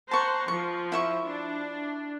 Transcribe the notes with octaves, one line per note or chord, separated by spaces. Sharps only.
C5 F#5 A5 A#5 C#6
F3 C#6
E4 E5 C#6
D4